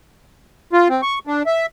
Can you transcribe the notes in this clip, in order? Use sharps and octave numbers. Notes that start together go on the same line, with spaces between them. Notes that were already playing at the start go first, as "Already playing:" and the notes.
F4
C4
C#6
D4
E5